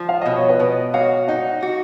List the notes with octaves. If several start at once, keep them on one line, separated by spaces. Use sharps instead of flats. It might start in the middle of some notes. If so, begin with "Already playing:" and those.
Already playing: F3
F5
B2 D#5
C#5
B4 D#5
B2
F#4 C#5 F5
D#4 D#5 F#5
F#4